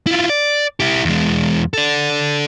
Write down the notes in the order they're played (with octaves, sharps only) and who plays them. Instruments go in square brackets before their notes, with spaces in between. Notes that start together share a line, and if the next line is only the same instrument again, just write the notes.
[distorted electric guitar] E4 F4
D5
E4 G4
E2 G#3
A4 D5